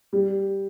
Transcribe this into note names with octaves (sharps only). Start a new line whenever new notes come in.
G3